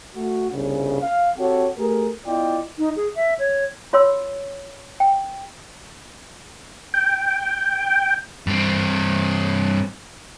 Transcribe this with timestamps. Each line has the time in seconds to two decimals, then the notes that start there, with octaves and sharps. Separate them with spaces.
0.15 A3 F#4
0.50 G1 C2 C#3
1.01 F5
1.38 C4 F#4 G4 A4 C#5 F#5
1.78 A3 G4 G#4 A#4
2.26 B3 E4 F4 D5 D#5 G5
2.78 D#4
2.96 G#4
3.15 E5
3.39 C#5
3.93 F4 C#5 C6 E6
5.00 G5
6.94 G5
8.47 G2 C4